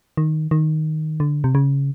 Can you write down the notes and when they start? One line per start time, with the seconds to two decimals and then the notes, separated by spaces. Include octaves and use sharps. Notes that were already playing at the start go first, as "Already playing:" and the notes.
0.17 D#3
0.51 D#3
1.20 D3
1.44 C3
1.55 C#3